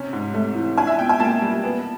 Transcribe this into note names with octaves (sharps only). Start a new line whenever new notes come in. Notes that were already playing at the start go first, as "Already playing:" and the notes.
Already playing: C3 C#4
G#2
A3
E3
D4 G#5
E5
B2 G5
G#5
A#3 A5
G3
B3